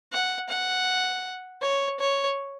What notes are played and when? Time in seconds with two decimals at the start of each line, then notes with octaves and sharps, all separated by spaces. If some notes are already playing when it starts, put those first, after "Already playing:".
0.12 F#5
0.49 F#5
1.61 C#5
1.99 C#5